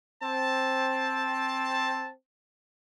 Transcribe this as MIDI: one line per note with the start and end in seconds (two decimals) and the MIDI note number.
0.22 2.10 60
0.22 2.10 81